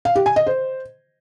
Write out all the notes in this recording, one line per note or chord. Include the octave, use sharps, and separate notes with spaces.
F5
G4
G#5
D#5
C5